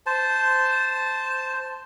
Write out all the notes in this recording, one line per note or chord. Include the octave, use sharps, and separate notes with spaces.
C5 A5